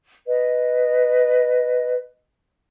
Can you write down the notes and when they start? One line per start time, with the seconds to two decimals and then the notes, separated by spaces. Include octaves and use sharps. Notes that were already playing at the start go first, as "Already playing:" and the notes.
0.27 B4 D#5